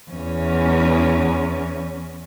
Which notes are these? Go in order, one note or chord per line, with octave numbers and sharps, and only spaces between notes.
E2 C#4